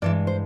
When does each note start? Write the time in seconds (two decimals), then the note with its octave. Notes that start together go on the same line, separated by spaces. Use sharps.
0.02 G2 E3 G#3 D5
0.27 C5